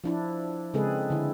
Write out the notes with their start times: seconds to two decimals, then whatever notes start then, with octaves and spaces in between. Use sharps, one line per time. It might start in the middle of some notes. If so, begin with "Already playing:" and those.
0.04 F3 D4 E4
0.74 C#3 G#3 C4 G#4 A4 B4
1.10 D3 E4